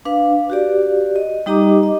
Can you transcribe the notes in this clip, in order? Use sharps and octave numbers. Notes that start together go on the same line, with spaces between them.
D4 B4 F5
F#4 G4 D5
D#5
G3 D#4 G4 D#5 A#5 D6
D#5